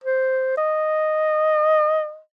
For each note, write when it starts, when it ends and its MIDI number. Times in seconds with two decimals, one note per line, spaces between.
0.04 0.53 72
0.57 2.19 75